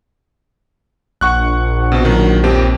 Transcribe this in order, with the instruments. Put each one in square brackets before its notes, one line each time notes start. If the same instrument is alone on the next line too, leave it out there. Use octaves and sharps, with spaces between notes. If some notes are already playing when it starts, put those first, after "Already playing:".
[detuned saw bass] A#1 [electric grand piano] F#5 C#6 F#6
[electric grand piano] B2 C4
D#3 F#3
D#2 C4 G4